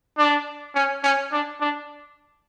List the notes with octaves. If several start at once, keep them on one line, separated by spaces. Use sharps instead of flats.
D4
C#4
C#4
D4
D4